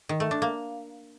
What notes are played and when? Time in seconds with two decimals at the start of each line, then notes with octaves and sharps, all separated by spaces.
0.09 D#3
0.20 A3
0.31 D4
0.42 A#3